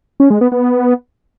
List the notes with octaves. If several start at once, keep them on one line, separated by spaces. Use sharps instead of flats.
C#4
G#3
B3
B3